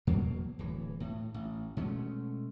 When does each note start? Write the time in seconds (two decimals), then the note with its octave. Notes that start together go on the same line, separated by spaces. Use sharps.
0.07 E2 B2 F#3 A#3
0.59 D1 E3
1.00 A2
1.34 A1
1.77 B2 G#3 A3 C#4